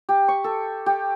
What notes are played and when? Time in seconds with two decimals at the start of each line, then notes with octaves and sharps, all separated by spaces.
0.09 G4
0.28 C#6
0.44 A4
0.86 G4